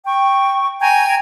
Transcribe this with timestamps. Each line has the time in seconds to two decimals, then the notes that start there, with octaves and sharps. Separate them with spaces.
0.06 G5 C#6
0.80 G5 G#5 A#5 G#6